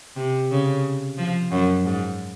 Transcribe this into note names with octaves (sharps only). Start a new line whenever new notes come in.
C3
C#3
F3
F#2
G#2